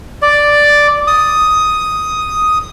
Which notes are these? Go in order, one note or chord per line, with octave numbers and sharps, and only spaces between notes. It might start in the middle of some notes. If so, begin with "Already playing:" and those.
D5
D#6